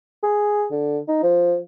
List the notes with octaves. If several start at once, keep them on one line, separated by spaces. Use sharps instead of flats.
G#4
D3
D#4
F3